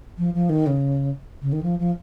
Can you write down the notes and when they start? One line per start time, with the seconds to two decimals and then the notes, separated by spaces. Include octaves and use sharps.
0.18 F3
0.34 F3
0.49 D#3
0.67 C#3
1.42 C#3
1.52 D#3
1.63 F3
1.79 F3